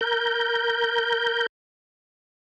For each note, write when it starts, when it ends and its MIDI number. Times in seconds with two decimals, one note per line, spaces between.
0.01 1.46 70
0.01 1.46 91